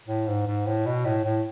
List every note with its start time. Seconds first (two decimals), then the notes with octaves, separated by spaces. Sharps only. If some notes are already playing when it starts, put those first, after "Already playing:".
0.08 A2
0.28 G#2
0.48 G#2
0.67 A2
0.87 B2
1.06 A2
1.25 A2